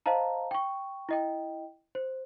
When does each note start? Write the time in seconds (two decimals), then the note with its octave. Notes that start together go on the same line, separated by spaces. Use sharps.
0.06 C5 D#5 F5 A5 A#5
0.51 G5 C#6
1.09 E4 D#5 G5
1.95 C5